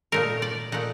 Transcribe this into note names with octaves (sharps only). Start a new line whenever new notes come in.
A#2 A3 D#4 A#4
D5
A#2 A3 D#4 F#5